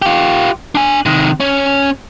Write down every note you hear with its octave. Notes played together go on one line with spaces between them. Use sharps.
F4 G4
D4 G#5
C3 D#3
C#4